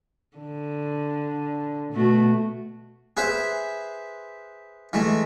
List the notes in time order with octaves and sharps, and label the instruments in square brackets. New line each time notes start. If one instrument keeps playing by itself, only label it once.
[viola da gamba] D3
B2 A3 F#4
[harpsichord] G#4 B4 C5 E5
E3 G#3 A3